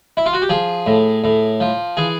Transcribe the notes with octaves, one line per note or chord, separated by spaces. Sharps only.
E4
F4
F#4
G4
F3 G#4
A2
A2
F3
E3 G#4